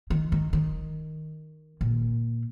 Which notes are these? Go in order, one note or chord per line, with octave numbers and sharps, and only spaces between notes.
D#3
D#3
D#3
A#2